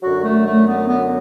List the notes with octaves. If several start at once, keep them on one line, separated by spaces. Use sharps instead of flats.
F#2 D3 F#3 F#4
A3
A3
B3
B3